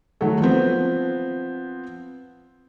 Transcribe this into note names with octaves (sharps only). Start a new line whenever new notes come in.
D#3 F#3 A3
F3 B3 C4 B4